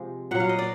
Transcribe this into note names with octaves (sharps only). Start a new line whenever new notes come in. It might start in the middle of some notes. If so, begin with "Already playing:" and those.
Already playing: C3 F3 G#3
A#2 F#3 F#5
F5
D#5
D5